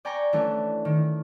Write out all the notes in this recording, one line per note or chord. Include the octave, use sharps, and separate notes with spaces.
D5 G5 G#5 A#5 C#6
E3 A3 C#4 D4
D#3